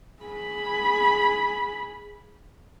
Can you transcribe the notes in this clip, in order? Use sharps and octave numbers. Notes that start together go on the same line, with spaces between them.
G#4 B5